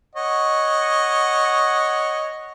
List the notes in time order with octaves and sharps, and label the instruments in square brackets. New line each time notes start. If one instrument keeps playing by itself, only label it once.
[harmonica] C#5 D#5 F#5